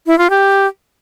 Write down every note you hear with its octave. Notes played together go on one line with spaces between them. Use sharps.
E4
F4
G4